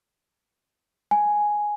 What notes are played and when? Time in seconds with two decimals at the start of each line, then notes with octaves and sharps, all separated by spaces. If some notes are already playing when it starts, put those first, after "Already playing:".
1.11 G#5